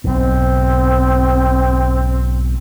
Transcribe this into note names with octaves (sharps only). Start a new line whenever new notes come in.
B1 G#2 C4